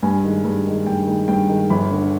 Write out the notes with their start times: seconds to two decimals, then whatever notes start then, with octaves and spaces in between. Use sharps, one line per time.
0.03 G2 G#5
0.24 D#3 G#3
0.44 G2
0.66 D#3 G#3
0.86 G2 G5
1.07 D#3 G#3
1.28 G2 G5
1.49 D#3 G#3
1.70 G1 B5
1.91 D3